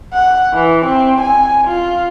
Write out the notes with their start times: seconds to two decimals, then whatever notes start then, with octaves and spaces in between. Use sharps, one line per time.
0.13 F#5
0.54 E3
0.86 C4
1.21 G#5
1.68 F4